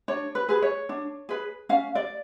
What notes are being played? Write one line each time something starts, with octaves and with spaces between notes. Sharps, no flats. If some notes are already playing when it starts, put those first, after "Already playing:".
D4 C#5
B4
G#4 B4
C#5
D4
G#4 B4
C#4 F5
D5